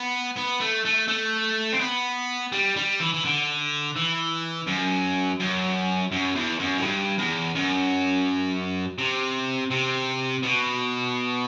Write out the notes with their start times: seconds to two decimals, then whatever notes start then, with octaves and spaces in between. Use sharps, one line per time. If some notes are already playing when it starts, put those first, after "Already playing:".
Already playing: B3
0.37 B3
0.61 A3
0.85 A3
1.08 A3
1.73 C4
1.81 B3
2.52 G3
2.76 G3
3.00 E3
3.14 E3
3.25 D3
3.96 E3
4.67 F#2
5.40 F#2
6.11 F#2
6.35 E2
6.59 F#2
6.79 A2
6.83 G2
7.19 E2
7.55 F#2
8.98 C3
9.70 C3
10.43 B2